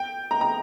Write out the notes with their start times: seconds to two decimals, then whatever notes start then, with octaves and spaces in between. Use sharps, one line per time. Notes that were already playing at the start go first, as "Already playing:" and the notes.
Already playing: G5
0.31 A#5
0.41 A#5